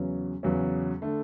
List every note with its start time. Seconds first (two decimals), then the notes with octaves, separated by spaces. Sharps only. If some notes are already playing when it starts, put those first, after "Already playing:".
Already playing: E2 C#3 F#3 C#4
0.43 E2 C#3 F#3 C#4
1.02 D3 A3